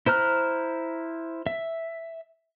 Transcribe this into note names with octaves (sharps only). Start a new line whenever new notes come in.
E4 C5 A#5 F6 F#6
E5